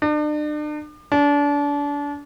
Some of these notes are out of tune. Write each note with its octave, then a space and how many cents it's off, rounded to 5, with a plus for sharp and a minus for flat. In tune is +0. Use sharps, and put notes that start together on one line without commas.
D4 +40
D4 -30